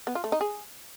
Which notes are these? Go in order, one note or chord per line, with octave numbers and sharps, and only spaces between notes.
B3
F4
A3
D#4
G#4